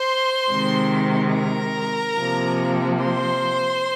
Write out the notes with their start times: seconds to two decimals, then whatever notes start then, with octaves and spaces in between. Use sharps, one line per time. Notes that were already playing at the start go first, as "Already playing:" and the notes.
Already playing: C5 C6
0.48 C3 D#3 G#3 C4
1.33 A#4 A#5
2.18 C3 F3 A#3
3.03 C5 C6